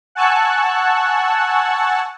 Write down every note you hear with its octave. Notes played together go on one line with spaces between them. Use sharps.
F#5 G#5 A5 C#6 E6 F#6